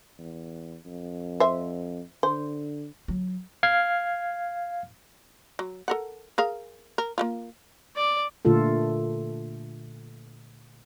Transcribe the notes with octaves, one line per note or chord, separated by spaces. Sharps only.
E2
F2
C5 E5
D3 C5
F#3
F5 F6 G#6 C7
F#3
A4 A#4 F#5
G#4 A#4 F5
A#4
A#3 E4 F4
D5
A#2 D3 A3 F4 A4